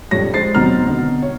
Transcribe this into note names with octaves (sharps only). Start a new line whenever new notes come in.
A#1 F2 G3 C#5 A#6
G#3 C5 A6 C7
D#2 B2 F#3 C4 A#5 F6
B2 D3
C#5